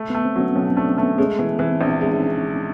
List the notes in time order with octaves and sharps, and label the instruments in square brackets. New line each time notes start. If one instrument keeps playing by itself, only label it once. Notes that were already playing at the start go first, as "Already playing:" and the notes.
Already playing: [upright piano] A3
[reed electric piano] B3
[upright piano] A3
[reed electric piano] C4
[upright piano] F#3 [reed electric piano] B3 C#4
[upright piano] B1 [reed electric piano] B3 C#4
[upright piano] A3 [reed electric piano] C4 D4
[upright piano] A3 [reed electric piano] B3 C#4
[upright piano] G#3 [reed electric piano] B3 C#4
[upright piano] E3 [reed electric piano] B3
[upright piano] E3 [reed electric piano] C4
[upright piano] A#1 [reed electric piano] C4 D4
[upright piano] G#3
[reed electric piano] C#4 D#4